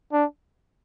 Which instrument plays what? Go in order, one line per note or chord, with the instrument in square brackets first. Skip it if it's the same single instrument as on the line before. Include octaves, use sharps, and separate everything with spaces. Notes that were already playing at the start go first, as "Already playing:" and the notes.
[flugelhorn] D4